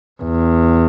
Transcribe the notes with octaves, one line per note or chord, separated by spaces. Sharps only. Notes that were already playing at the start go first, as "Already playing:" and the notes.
E2